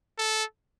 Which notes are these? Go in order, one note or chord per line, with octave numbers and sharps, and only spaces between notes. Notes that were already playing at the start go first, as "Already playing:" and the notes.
A4